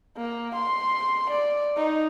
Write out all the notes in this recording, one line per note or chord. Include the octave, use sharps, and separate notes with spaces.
A#3
C6
D5
D#4